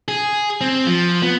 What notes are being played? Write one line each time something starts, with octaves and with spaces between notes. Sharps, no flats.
G#4
C4
F3
B3